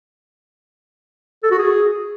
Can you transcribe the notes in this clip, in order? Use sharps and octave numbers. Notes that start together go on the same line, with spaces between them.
A4
F#4
G#4